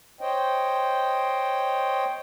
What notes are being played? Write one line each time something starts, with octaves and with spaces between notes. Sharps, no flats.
C5 C#5 D#5 G5